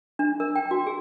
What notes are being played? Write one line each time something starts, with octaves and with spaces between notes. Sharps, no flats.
D4
A#4
G5
F#4
G#4